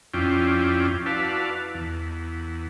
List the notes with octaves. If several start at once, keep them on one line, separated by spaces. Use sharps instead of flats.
F2 C#4 E4 F4 D5 G5
E4 F#4 B4 D5 F5 A5
E2